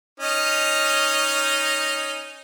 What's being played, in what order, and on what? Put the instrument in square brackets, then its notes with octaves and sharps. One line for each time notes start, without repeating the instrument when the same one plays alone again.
[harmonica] C#4 D#4 D#5